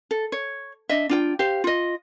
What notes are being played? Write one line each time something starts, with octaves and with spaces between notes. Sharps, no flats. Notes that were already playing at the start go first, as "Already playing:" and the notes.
A4
C#5
D4 D#5 E5
D4 F4 G5
G4 C5 F5
F4 D#5